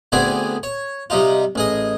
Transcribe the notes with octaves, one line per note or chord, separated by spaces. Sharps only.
D2 B3 C4 G#4 D5 G#5
C#5
C3 G3 D#4 F4
A1 G#4 D#5